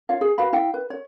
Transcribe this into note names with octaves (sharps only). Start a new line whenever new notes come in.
F4 C#5 F5
G#4
F#4 B4 F5 B5
E4 F5 G5
B4
C#5